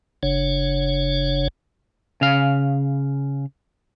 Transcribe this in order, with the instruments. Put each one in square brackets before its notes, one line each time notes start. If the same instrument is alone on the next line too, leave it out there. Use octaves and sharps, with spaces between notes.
[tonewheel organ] F#1 C#3 D4 C#5
[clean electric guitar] C#3 F5